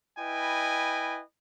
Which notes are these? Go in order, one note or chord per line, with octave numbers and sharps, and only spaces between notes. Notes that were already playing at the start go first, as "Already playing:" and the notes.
E4 B4 D#5 G5 G#5